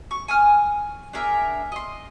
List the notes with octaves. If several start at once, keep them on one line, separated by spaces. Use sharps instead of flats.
C#6
G#5 D#6 F6
D4 G#4 A#4 E5
D#5 C6